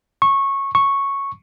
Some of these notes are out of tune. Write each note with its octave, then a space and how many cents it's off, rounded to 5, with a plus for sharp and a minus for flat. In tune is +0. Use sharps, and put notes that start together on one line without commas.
C#6 -15
C#6 -5